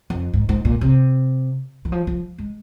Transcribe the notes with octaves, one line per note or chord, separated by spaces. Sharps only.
F2
G#2
G#2
A#2
C3
E3
F3
F3
G#3